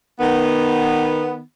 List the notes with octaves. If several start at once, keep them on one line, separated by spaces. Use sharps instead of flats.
D#3 B3